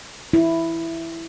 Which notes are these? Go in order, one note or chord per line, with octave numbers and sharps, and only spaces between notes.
E4